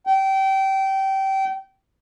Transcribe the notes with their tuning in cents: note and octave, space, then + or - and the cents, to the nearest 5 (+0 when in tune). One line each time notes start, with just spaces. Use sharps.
G5 -25